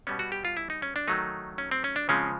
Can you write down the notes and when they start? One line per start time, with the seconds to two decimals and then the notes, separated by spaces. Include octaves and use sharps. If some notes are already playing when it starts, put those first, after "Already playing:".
0.07 B2 G3 B3 C#4
0.19 F#4
0.32 G4
0.45 F4
0.57 E4
0.70 D#4
0.82 C#4
0.96 D4
1.08 D#3 F#3 A3 D#4
1.58 C#4
1.71 C4
1.84 C#4
1.96 D4
2.09 C#3 F3 G#3 C4 C#4